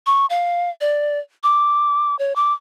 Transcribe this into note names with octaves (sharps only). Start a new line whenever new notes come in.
C#6
F5
D5
D6
C#5
D6